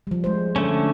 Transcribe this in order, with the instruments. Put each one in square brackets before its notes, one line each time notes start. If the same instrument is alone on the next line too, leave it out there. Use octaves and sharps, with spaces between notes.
[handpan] F3 G3
G#3 C5
[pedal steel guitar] D3 A3 C#4